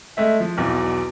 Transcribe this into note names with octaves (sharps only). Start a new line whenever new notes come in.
G#3 A3 E5
F3
B1 E2 B2